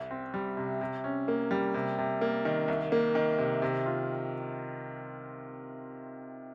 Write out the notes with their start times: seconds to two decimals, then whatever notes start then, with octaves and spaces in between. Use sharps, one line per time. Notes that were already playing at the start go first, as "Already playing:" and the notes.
Already playing: C2
0.11 C4
0.34 G3
0.57 C3
0.81 C3
1.04 C#4
1.28 A#3
1.51 G3
1.74 C3
1.98 C3
2.21 A#3
2.45 D#3
2.68 C2
2.92 A#3
3.15 D#3
3.38 C3
3.62 C3
3.86 F4